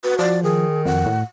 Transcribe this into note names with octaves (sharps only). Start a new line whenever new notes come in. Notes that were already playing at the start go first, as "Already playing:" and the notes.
F#4 B4
F3 D5
D#3 G#4
F2 F#5
A2